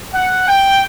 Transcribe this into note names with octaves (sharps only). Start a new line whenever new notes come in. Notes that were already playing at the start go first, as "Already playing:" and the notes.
F#5
G5